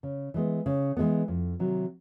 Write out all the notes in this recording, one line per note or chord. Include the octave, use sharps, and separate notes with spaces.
C#3
E3 G#3 B3
C#3
E3 G#3 B3
F2
C3 D#3 F#3